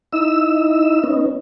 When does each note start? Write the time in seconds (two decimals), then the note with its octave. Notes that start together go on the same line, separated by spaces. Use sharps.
0.13 D#4 E4 E6
1.04 B3 C#4 D#4